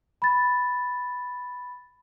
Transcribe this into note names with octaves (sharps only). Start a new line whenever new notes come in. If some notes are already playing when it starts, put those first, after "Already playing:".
B5 A6